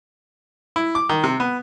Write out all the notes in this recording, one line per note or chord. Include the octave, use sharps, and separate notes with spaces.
E4
D6
D#3
C3
B3